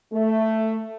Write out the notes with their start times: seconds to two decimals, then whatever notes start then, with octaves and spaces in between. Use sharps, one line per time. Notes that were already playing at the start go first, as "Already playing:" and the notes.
0.12 A3